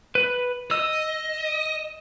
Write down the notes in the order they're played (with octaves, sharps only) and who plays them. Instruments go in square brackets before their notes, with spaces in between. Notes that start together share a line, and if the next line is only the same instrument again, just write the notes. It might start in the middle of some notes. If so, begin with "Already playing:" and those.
[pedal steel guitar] B4
[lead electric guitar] D#5 [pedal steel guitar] E6